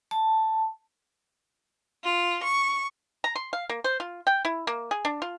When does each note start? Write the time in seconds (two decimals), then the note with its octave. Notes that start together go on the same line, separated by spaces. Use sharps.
0.11 A5
2.05 F4
2.43 C#6
3.24 A#5
3.35 C6
3.53 F5
3.69 A#3
3.84 C5
4.00 F4
4.27 G5
4.45 E4
4.67 A#3
4.91 G#4
5.05 D4
5.22 F4